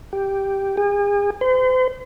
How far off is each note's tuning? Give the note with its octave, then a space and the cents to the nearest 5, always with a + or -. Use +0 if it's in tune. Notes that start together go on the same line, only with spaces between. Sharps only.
G4 +0
G#4 -40
C5 -40